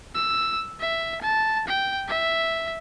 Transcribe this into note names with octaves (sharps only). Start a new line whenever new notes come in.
E6
E5
A5
G5
E5